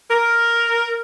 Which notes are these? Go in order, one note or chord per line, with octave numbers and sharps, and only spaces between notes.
A#4